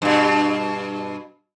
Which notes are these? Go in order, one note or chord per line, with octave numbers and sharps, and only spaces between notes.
G2 B2